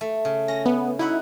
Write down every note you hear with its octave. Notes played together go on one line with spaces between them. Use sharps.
A3
C#3
C#4 A#6
B3
D#4 E4 F#4 F#5